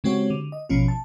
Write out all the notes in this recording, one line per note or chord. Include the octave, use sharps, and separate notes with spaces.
C#3 G#3 C4 F#4 G4 C#5
D3
D#5
A1 B2 F3 C#4 F4
A5